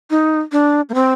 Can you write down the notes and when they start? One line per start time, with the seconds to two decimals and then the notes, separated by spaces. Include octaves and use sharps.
0.10 D#4
0.52 D4
0.89 A#3
0.94 C4